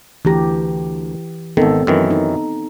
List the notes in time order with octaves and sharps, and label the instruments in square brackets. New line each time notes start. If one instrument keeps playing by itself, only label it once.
[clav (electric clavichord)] D2 A#5 [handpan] E3 G4
[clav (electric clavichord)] G#1 D#3 [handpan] B3 C4 A4
[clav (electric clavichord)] F#2 D#3 E3
[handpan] D#4